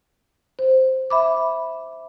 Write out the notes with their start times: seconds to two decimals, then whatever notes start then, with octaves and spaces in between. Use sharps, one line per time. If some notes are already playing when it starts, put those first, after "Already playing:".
0.59 C5
1.10 E5 B5 D6